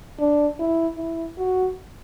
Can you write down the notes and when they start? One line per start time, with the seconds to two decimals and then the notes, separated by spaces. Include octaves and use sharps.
0.20 D4
0.59 E4
0.98 E4
1.38 F#4